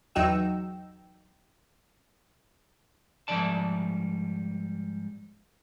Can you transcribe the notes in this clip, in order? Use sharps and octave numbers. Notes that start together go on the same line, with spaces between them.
E2 F#3 D#4 F#4 G5 E6
G#2 F3 G3 D5 A5